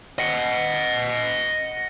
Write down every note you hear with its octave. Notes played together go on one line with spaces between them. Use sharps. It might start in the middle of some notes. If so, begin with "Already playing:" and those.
D#5 F#5